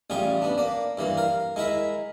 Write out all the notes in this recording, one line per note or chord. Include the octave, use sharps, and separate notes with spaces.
A1 G3 F4 G#4 G5
B3 D4
A#3 D5
G2 E3 A#3
A#4 F5
G#3 E4 A#4 E5